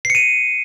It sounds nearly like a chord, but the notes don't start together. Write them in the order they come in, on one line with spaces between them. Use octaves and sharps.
C7 C#7 D#7